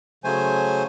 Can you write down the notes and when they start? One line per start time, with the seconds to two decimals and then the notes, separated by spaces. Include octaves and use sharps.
0.24 C#3 F#3 A3 C5 G#5